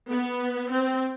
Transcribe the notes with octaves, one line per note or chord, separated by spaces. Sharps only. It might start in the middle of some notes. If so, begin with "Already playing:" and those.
B3
C4